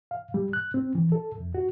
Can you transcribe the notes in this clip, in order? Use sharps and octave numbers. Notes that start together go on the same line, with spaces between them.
F5
G3
F#6
C4
E3
A4
F2
F#4